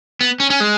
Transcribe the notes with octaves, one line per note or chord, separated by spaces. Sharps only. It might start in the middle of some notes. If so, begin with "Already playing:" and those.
B3
C#4
C#4
G#3